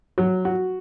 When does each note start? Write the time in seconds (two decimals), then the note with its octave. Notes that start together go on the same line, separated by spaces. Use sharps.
0.18 F#3
0.45 F#4